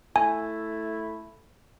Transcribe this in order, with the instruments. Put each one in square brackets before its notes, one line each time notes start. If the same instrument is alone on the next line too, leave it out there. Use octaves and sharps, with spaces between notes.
[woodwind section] A3 E4 [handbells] G#5